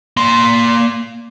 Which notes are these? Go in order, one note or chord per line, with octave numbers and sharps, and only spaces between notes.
A#3 C6